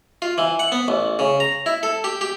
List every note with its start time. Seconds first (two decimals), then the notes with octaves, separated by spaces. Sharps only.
0.22 F4
0.38 E3
0.59 F#5
0.72 B3
0.88 A1
1.19 C#3
1.40 A#5
1.66 E4
1.83 A4
2.04 G4
2.21 G4